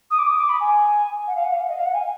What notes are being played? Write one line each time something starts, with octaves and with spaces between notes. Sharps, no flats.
D#6
D6
D#6
D6
B5
G#5
F#5
F5
F#5
F5
F#5
D#5
F5
F#5
G#5